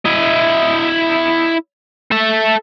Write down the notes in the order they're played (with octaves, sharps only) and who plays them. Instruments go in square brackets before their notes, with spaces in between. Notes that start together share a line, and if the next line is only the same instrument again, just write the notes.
[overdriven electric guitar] E4 D#5
A4 E5